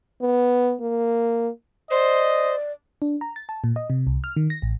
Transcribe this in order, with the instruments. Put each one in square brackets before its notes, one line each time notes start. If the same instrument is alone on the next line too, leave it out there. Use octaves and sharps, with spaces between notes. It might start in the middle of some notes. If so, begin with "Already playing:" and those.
[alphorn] B3
A#3
[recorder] C5 [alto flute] D5 [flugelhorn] D#5
[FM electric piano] D4
A#5
A6
A5
A#2
D#5
C3
C2
F6
D#3
A#6
A1